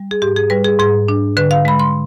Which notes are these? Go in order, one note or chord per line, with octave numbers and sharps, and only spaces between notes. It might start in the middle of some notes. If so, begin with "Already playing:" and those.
Already playing: G3
G#4
G#2 G4
G#4
G3 B4
G#4
G#2 G#4
D4
D3 B4
F5
G#3 B5
C6